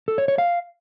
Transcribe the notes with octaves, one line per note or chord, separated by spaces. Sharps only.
A4
C#5
C#5
F5